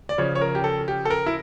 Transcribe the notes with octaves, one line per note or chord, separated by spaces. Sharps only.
D5
C#3 F3 C#4 C#5
C#5
A#4
G4
A4
G4
A4
A#4
E4